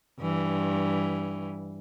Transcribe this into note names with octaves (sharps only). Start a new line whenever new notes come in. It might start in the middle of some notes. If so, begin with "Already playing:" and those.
G2 E3